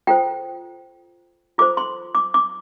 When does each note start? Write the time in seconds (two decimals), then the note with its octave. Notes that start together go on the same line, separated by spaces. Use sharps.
0.07 F4 A4 C5 G5
1.58 F4 A4 C5 D6
1.77 C6
2.15 D6
2.34 D6